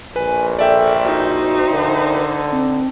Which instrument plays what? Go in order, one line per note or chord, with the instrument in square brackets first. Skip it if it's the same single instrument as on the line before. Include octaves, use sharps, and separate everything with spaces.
[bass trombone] A#1 [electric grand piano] B4 [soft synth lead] G#5
[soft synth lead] A4 [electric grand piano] D5 E5 G5
[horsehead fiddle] D#4 C5 [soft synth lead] F#4
[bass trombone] D3 [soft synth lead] A#4
[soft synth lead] C4